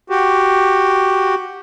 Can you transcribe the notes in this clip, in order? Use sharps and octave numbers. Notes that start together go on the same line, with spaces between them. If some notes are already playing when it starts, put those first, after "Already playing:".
F#4 G4